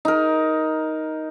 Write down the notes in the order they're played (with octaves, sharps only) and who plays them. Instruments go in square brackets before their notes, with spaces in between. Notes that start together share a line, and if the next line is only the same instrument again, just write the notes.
[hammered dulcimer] D#4 A#4